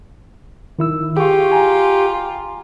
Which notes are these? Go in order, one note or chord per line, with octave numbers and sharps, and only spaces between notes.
D#3 E4 E6
F4 G4 G#4 C#6
G#5 A#5